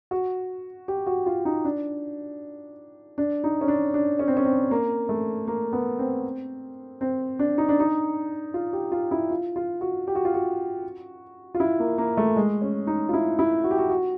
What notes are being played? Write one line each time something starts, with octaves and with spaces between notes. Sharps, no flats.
F#4
G4
F#4
F4
D#4
D4
D4
D#4
C#4
D4
D4
C#4
C4
C#4
C4
A#3
A3
A#3
B3
C4
C4
D4
D#4
D4
D#4
F4
G4
F4
E4
F4
F4
F#4
G4
F#4
F4
F#4
F4
E4
A#3
A#3
A3
G#3
C#4
D#4
F4
E4
E4
F#4
G4
F#4
F#4